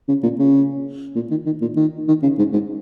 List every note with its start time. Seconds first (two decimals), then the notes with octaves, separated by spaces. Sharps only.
0.08 C#3
0.23 A#2
0.39 C#3
1.15 A#2
1.31 D#3
1.46 D#3
1.61 A#2
1.76 D#3
2.08 D#3
2.23 C#3
2.39 G#2
2.53 G#2